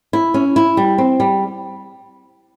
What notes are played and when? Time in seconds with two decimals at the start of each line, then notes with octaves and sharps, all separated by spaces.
0.13 E4
0.34 C#4
0.56 E4
0.77 G3
0.98 C4
1.20 G3